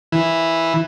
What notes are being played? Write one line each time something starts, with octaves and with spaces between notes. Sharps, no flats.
E3